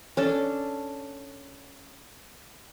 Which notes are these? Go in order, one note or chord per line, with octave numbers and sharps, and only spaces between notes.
C#4 D4 A4